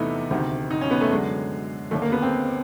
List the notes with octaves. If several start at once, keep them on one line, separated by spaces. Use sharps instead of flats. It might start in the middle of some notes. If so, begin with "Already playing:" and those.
Already playing: E2 C3 E3 A3 B3 D#4 E4
D2 C3 D#3
D#4
C#4
B3
A3
F#2 D3 G#3
D#2 D3 A3
A#3
B3
C4